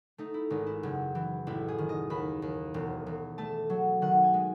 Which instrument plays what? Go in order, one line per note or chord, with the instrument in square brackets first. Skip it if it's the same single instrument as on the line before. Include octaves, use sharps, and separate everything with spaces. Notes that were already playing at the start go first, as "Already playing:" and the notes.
[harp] A3 D#4
E4
G#1 D#4
E4
F#1
E3
A1 E4
G#4
D#3
D#5
D#2 B5
D#2
E1
E1
A3 A5
F#3
D#3 F#5
G#5
G#3